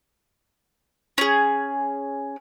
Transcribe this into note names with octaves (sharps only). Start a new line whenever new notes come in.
C#4 G#4